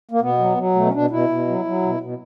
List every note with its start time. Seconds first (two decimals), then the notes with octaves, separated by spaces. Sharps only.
0.11 A#3
0.21 B2 B3
0.39 F#3
0.57 F#3
0.75 B2 A3
0.86 C#4
0.93 B2 D4
1.10 B2 E4
1.29 B2
1.47 F#3
1.65 F#3
1.83 B2
2.00 B2